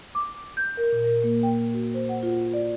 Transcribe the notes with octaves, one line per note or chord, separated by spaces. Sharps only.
D6
G6
A#4
A#2
A#4
A#3
G5
F#4
C5
F#5
F4
D5